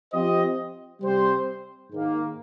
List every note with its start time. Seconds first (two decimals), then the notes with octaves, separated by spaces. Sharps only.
0.11 F3 C4 G4 C5 D#5
1.01 C3 G3 C4 G4 C5
1.91 G#2 D#3 A#3